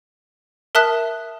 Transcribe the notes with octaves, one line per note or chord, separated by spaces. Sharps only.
A#4 E5 A5 D#6 F#6 B6